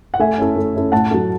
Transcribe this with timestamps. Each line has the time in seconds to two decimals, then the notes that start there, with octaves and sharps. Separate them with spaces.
0.14 F#5
0.20 A3 E5 G#5
0.38 C#4 E4 A4
0.56 A3
0.75 C#4 E4 A4
0.92 A2 F#5 A5
1.11 F#3 A3